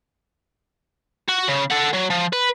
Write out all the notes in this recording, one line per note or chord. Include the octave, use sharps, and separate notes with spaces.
F#4
C#3
A4 F#5
F#3
F3
B4